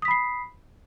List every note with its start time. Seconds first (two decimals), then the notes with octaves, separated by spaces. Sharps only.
0.02 D#6
0.05 B6
0.08 B5
0.11 C7